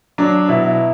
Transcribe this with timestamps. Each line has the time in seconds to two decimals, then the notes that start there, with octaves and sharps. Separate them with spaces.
0.18 F#3 D4
0.49 B2 E4